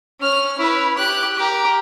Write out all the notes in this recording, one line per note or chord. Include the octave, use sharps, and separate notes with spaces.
C#4 F6
E4 B4
G4 F#6
G4 A#4